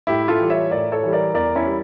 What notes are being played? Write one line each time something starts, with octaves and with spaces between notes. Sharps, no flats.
A2 E4 G4
F4 A4
E3 G3
C#5 E5
A2 A#4 D5
A4 C#5
E3 G3
A#4 D5
E2 A#4 D5
C#4 E4
G3